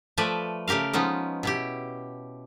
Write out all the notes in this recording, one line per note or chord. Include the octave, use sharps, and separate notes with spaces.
F3 A3 B4 D5 E5
C#3 A3 G4 A#4 F5
F3 G#3 B3 C#4 D#4
B2 E4 G4